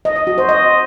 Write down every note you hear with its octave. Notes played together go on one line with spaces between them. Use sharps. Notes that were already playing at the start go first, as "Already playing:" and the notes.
D#5
D#5
F#4
C5
D#5